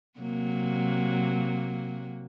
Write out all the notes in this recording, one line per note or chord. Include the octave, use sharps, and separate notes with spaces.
C3 F#3 A#3